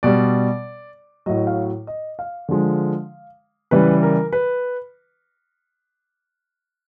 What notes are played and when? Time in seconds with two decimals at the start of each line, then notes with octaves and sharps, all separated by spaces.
0.03 B2 G3 D5
1.26 A2 F#3 D#5
1.47 F5
1.87 D#5
2.19 F5
2.49 D3 F3 G#3
3.71 C#3 E3 G3 B4
4.03 A#4
4.33 B4